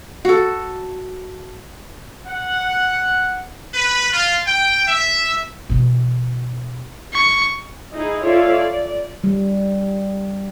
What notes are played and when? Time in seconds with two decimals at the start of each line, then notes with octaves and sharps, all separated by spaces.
0.25 F#4 A4
2.27 F#5
3.73 B4
4.11 F4
4.45 G5
4.86 E5
5.70 B2 E3
7.14 C#6
7.93 D#4 E4 G#4
8.22 F4 A4 C#5 D5 E5 F5
8.52 D5
9.24 G3